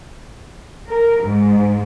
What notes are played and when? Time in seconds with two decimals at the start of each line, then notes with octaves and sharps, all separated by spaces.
0.89 A#4
1.23 G#2